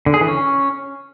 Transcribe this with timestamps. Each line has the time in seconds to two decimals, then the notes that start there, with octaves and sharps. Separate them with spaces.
0.06 D3
0.14 G#4
0.21 E3
0.28 C#4